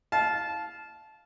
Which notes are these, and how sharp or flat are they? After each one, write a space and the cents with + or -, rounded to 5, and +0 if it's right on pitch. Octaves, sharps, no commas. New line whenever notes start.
F5 +0 A5 -20